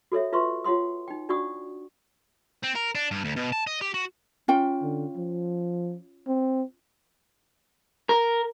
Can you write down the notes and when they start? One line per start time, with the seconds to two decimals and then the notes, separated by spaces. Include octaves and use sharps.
0.12 F#4 A4 C#5 E5
0.33 F4 B4 E5 C6 C#6
0.64 F4 C#5 F#5 C6 D#6
1.08 D#4 G5
1.29 D4 F#4 D5 F#5 C#6 D#6
2.63 C4
2.75 A#4
2.95 D4
3.11 G2
3.25 D2
3.36 B2
3.52 A5
3.67 D#5
3.81 G4
3.94 F#4
4.48 C#4 F4 G5
4.82 D3
5.17 F3
6.27 C4
8.09 A#4